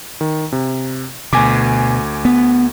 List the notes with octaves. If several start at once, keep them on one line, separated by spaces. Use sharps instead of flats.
D#3
C3
D2 B2 G#5 D6
B3